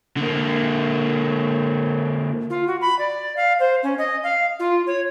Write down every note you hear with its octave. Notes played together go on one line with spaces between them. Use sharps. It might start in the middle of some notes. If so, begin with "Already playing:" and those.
D3 A#3
F4
F#4
B5
D5
F5
C5
C#4
D#5
F5
F4
C#5